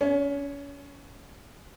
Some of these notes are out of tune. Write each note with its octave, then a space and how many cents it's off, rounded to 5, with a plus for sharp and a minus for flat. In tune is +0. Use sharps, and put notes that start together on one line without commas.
C#4 +30 C#5 +0